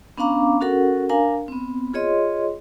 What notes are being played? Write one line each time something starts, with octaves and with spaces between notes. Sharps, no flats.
B3 C#4 D4 F5 A#5 D6
C#4 F#4 A4 A#4 F#5
D4 A#4 F5 G#5 A#5
B3 C4
F4 G#4 C#5 D#5 C6